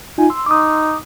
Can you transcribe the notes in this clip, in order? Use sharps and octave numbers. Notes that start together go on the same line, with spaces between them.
D#4 F4 G#5
C6 E6
D#4 D6 D#6